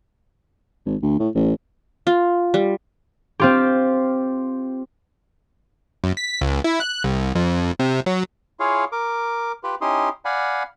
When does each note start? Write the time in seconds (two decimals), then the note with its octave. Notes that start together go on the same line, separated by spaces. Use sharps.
0.86 G#1
1.02 D2
1.19 A2
1.35 A1
2.07 F4
2.54 G3
3.40 C4 F4 G4
6.04 F#2
6.17 B6
6.41 C#2
6.64 E4
6.80 F#6
7.04 C2
7.35 F2
7.79 C3
8.06 F#3
8.60 E4 F4 G#4 C#5 F5
8.92 A#4 D6
9.64 F4 G4 B4
9.81 C#4 D#4 E4 G4 C6 D#6
10.25 D5 F5 F#5 G#5 B5